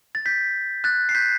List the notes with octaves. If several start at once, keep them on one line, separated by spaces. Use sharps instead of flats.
A6
G6 B6
F#6 A6
C7
G6 B6